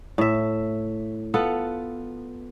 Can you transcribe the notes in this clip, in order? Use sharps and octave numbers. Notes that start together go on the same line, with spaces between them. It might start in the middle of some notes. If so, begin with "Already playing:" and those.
A2 E5
B3 F4 A4 F#5